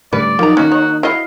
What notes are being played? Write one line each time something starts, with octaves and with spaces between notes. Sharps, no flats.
A2 D3 G3 C#4 B4 D5
F3 F#3 A#3 D#4 A#5
D#3 A#3 C#4 F#4
C#5
E4 F#4 D#5 F5